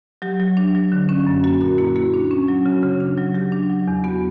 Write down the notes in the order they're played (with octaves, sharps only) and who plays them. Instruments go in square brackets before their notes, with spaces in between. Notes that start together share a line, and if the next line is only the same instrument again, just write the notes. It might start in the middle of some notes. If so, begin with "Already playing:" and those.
[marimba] F#3 G4
F#3
D4
F#3
D3
C#4
F#2
A#3 F#4
A#2 F#4
A#3 E4
A#3 F#4
D4
C#4
F#3
C#3 F#4
C#3
D4
F#3
F#3 G4
D4
F#3
E2
B3 F#4